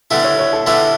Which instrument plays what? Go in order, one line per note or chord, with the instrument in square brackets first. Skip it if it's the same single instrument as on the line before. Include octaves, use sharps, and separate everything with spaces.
[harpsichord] D3 G3 B3 E4 [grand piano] A4
[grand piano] C#5
C#5
A4
[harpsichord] D3 G3 B3 E4